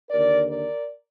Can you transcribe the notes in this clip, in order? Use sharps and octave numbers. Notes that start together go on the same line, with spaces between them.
D#2 D3 A#4 D5
A#4 D5